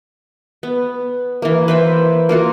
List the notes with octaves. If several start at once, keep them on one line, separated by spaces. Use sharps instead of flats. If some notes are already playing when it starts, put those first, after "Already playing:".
B3
E3 A#3
B4 C5 E5
A#3 F4 F#4